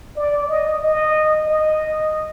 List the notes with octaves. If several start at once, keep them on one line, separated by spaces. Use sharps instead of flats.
D5
D#5
D#5
D#5